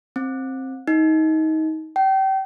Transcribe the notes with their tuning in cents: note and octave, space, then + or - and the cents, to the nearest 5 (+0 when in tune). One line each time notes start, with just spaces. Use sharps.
C4 +15
D#4 +25
G5 -30